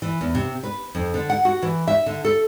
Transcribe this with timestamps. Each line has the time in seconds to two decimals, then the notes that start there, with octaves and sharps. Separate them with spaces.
0.02 E3
0.21 E2
0.35 C3
0.63 B4
0.95 F2
1.14 D3
1.30 F#5
1.45 F#4
1.62 E3
1.88 E5
2.06 D3
2.24 A4